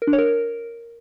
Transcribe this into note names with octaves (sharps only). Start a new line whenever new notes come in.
A#4
D4
C#5
A#4